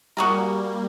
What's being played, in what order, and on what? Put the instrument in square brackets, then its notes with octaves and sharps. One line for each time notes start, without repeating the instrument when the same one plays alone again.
[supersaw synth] G3 A#3 [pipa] F#4 G#4 A#4